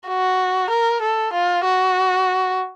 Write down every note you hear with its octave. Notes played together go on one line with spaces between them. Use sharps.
F#4
A#4
A4
F4
F#4